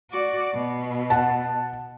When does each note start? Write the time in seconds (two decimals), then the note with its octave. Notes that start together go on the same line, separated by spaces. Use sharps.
0.11 F#4 D5
0.54 B2
1.10 F#5 A5